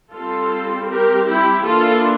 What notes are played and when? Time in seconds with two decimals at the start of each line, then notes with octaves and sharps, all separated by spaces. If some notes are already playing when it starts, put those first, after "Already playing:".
0.12 G3 C4 F4 A4
0.88 G4 A#4
1.27 E4 G4
1.64 E3 A#3 D4 F4 A4